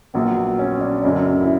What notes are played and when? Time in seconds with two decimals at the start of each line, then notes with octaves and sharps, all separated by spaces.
0.14 A#1 A#2 F#3 B3
0.59 C#4
0.81 D4
1.04 F#1 F#2 D3 F#3 C#4
1.41 E4